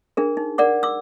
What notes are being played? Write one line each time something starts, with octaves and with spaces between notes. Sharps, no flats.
D4 G#4 A#4
D#4
A#4 D5 F#5 D6
D6 E6